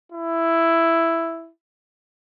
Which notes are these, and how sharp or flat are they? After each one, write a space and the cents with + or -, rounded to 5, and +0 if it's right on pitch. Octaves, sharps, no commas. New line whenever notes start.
E4 +5